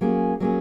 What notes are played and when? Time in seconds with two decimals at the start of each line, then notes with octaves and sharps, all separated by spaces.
0.01 F#3 A#3 C#4 G#4
0.40 F#3 A#3 C#4 G#4